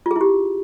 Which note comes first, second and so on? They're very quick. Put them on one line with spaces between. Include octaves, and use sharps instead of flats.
F4 G#4 E4 G4